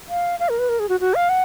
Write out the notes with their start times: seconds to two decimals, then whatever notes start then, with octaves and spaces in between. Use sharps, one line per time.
0.09 F5
0.40 F5
0.49 A#4
0.59 B4
0.69 A#4
0.79 G#4
0.89 F#4
1.00 F#4
1.15 F5
1.29 F#5